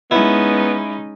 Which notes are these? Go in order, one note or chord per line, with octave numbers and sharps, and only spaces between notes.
G#3 B3 C#4 D#4 E4